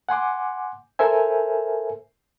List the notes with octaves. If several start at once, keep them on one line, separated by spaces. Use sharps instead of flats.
F#5 G#5 C6 D6
A4 A#4 C5 E5 G#5